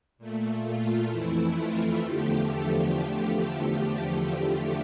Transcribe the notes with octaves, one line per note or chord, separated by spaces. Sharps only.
A#2 A3
F4
F2 E3 A3 E4
F4
E2 D3 F3 A3 G4